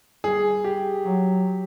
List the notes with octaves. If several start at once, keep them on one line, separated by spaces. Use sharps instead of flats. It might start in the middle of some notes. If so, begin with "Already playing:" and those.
G3 G#4
G4
F#3